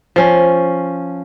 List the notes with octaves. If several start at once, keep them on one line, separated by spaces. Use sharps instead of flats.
F3 C#4